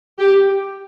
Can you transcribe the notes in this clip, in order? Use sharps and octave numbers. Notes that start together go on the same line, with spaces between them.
G4